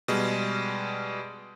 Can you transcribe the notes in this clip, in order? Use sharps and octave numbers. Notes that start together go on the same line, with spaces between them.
B2 G3 G#3